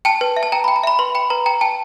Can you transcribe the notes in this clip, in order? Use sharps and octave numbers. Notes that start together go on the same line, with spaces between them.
G5 A5
B4
E5
A5
G5 A#5
G5 B5
A#5
E5 B5
B4 C6
G5 B5
B4 A#5
G5 A#5
G5 A5